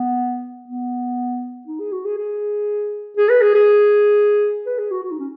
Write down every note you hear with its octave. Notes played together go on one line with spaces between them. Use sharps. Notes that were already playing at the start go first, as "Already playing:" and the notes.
Already playing: B3
B3
D#4
G#4
F#4
G#4
G#4
G#4
B4
G#4
G#4
B4
G#4
F#4
F#4
D#4
C#4